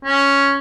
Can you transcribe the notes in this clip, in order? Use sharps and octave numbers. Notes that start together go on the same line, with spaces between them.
C#4